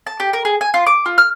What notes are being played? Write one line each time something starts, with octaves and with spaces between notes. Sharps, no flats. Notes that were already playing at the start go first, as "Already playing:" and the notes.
A5
G4
A#4
G#4
G#5
F4
D6
F4
F6